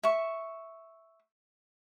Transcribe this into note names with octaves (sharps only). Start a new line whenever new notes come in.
E5 C#6